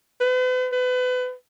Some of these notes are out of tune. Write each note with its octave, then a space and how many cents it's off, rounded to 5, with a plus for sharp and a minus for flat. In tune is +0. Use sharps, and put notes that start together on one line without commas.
B4 +45
B4 +30